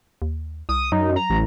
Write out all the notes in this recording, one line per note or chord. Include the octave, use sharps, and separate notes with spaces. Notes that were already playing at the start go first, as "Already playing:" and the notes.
D#2
C2 D#6
F#2 F#3 D#4
A#5
A1